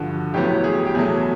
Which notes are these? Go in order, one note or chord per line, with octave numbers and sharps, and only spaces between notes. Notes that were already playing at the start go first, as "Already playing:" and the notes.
Already playing: G2 D3 F3 F#4
A1 A2 F#3 B3 G4
G#4
G4
E2 B2 F#3 A3 G#4